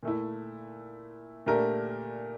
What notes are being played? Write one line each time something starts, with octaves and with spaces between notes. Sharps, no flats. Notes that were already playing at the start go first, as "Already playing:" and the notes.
A#2 A3 E4
A#2 A3 D4 G4 A#4